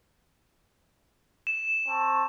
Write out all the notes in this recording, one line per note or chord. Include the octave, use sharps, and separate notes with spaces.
E7
C4 A5 C#6